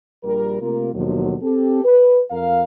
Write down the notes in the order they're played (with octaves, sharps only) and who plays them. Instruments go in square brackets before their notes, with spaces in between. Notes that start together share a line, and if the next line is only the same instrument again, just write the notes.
[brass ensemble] A#1 G3 A#4
C3 A3 A#3 F4 A#4
D#2 B2 D3 F3 F#3
C4 G4 A4
B4
F2 A#4 F5